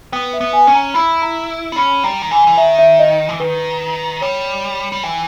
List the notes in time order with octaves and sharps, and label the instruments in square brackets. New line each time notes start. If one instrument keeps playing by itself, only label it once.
[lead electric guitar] B3 [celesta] G5
[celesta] E5
[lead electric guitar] B3
[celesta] G#5
[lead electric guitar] C#4
[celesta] A#5
[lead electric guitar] E4 [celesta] B5
[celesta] A#5
[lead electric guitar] B3
[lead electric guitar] C#4 [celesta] B5
[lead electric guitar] G3 [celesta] A#5
[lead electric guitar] D#3
[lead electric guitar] E3 [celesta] G#5
[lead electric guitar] E3
[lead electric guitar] D#3 [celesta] E5
[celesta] E5
D#5
[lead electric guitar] E3
[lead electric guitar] D#3 [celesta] B4
[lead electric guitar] G3 [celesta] C#5
[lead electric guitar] G3
[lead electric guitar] E3 [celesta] G5